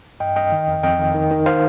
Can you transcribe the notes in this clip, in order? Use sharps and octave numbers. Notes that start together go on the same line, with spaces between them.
G2 D#5 G5
G2 D#5 G5
D#3
F2
F2 D#5 G5
D#3
D#3
D#3
D#3 C5 F5